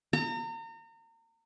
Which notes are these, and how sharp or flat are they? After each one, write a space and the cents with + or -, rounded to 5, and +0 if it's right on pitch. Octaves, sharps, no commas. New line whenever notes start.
A#5 -35